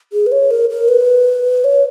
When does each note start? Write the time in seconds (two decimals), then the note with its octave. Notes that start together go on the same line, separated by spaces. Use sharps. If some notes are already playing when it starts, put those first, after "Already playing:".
0.13 G#4
0.26 B4
0.32 C#5
0.51 A#4
0.70 A#4
0.88 B4
1.64 C#5